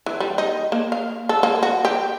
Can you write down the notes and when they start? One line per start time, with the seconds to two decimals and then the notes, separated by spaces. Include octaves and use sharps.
0.06 E3
0.20 G3
0.38 D#4
0.72 A#3
0.92 F5
1.29 A4
1.43 A#3
1.63 F#4
1.85 G4